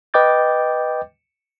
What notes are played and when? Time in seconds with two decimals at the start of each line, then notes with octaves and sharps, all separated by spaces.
0.14 B4 D#5 G5 D6 G6 A6